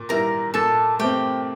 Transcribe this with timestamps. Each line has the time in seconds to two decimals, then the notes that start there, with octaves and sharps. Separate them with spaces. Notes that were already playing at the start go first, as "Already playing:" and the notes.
Already playing: A#2
0.09 G3 A#3 E4 A#4 A#5
0.54 A#2 A4 A5
0.99 A3 C4 G4 G5